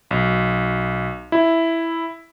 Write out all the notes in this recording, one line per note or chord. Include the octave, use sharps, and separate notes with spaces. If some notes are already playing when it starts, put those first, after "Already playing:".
B1
E4